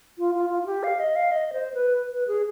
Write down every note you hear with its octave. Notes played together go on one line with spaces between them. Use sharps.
F4
F4
F4
F4
G4
F5
D#5
F5
D#5
C5
B4
B4
G#4